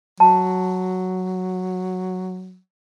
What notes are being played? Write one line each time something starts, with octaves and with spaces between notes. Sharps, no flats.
F#3 A5